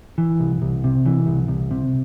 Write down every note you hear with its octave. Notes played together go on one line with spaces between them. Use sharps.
E3
C2
C2
C3
E3
C2
C2
C3